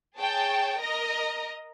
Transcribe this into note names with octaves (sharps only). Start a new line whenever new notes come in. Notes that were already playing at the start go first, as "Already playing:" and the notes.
G#4 C#5 G5 A5
A#4 D#5 A#5 A#6